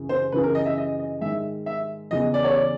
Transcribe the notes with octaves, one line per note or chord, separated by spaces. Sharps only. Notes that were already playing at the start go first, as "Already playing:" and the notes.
Already playing: F#2 C#3 E3
C5
F#2 C#3 E3 B4
A#4
D#5
E5
D#5
D#5
G#2 D#3 E5
E5
E2 C#3 E3 D#5
D5
C#5
D5